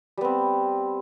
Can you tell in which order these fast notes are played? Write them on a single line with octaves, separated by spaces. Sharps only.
G3 B3 C4